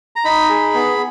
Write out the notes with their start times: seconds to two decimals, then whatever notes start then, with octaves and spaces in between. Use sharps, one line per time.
0.16 A#5
0.25 D#4 B5
0.50 G#4
0.74 B3